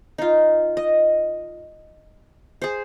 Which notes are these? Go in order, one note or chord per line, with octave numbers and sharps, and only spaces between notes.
D#4 F4
D#5
G#4 C5